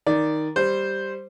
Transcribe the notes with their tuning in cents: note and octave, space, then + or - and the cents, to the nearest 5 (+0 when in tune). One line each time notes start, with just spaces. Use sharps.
D#3 +0 D5 +0
G3 +0 C5 +0